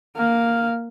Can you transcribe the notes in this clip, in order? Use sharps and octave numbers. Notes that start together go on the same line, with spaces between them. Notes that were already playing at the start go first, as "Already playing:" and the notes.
A#3 F5